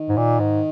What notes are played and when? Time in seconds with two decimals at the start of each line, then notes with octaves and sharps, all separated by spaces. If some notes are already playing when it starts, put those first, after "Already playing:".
Already playing: D#3
0.09 G#2
0.17 A#2
0.40 G#2